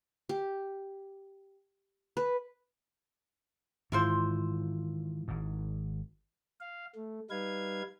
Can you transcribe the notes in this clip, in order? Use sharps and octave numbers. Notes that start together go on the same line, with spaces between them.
G4
B4
G#2 D#3 E3 E4 F4 C5
G#1 G#2
F5
A3
G3 D#4 B4 F5 G#6